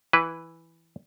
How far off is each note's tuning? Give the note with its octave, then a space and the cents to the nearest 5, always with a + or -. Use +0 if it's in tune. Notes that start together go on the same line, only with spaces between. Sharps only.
E3 +0 E4 +0 B4 +0